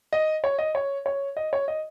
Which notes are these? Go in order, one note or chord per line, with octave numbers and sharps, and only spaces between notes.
D#5
C#5
D#5
C#5
C#5
D#5
C#5
D#5